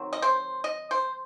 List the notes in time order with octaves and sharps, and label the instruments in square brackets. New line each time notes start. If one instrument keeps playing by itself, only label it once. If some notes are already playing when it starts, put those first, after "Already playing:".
Already playing: [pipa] D#3 F#3 C4
D#5
C5
D#5
C5